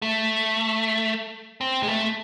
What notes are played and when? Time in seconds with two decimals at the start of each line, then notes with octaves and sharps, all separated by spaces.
0.02 A3
1.61 C4
1.83 G#3
1.88 A3